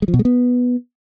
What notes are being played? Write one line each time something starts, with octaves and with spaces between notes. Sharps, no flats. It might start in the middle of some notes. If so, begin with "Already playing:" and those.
G#3
F3
B2
G#3
B3